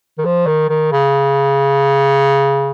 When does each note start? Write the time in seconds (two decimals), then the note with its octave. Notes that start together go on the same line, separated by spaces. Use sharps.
0.18 D#3
0.25 F3
0.47 D#3
0.69 D#3
0.92 C#3